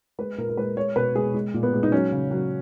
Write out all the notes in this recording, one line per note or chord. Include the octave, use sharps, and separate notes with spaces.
G#3 B4
A#2 A#4
A#4
G#3 B4
G#3 C#5
B2 B4
G#3 G#4
G#3
A#2
B3
G#3
D#4
F#3 C#4
C#3
F#3